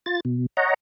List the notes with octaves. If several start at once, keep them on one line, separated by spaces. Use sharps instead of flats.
F4 A6
B2
C#5 D#5 F#5 A#5